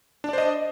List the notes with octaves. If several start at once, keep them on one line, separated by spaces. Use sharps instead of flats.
D4 C5 D5 D#5